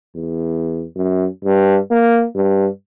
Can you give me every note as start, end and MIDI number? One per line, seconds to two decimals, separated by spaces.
0.15 0.86 40
0.96 1.27 42
1.45 1.79 43
1.91 2.26 58
2.36 2.68 43